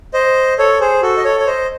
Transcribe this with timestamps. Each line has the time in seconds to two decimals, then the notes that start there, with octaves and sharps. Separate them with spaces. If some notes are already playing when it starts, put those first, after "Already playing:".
0.14 C5 D#5
0.58 A4 C#5
0.80 G#4 C5
1.02 F#4 A4
1.17 D#5
1.24 A4 C#5
1.39 C#5
1.46 C5 D#5